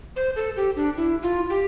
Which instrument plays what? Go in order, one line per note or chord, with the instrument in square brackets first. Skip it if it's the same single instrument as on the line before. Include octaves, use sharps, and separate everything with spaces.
[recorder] C5
A4
G4
D4
E4
F4
G4